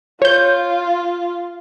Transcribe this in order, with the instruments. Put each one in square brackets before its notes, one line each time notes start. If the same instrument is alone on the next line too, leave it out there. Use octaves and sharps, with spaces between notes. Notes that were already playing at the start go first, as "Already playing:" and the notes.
[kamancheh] F4 [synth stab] C#5 G6